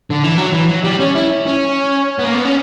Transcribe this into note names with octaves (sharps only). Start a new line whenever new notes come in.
D3
E3
F#3
E3
F#3
G3
C#4
E4
C#4
B3
A#3
B3
C#4